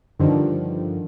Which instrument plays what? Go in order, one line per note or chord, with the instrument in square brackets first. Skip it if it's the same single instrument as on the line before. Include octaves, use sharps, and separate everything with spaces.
[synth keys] G2 D3 D#3 F3